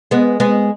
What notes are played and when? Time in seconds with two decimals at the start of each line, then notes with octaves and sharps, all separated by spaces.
0.11 G#3 B3
0.40 G#3 B3